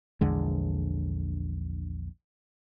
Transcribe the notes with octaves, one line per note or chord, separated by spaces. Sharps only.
A#1 E2 D3 G#3